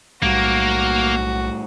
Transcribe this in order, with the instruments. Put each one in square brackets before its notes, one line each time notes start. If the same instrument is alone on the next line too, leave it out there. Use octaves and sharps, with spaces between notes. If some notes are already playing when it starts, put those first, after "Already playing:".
[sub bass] B1 [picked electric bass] A2 G3 [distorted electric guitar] A#3 [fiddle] F#4